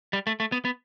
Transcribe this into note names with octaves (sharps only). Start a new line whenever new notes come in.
G3
A3
A3
B3
B3